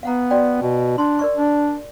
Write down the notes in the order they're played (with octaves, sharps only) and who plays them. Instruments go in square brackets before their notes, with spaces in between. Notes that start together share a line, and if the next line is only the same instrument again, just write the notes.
[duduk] B3 [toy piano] F5 F#5 A#5
[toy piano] F#4 D5 G5
[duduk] B2
[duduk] D4 [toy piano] A5 C6
[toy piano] A#4 D5 C#6
[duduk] D4